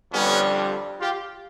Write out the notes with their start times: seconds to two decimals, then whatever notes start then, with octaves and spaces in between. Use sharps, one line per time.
0.12 F2 D3 G3 B3 C#4
1.01 F4 G4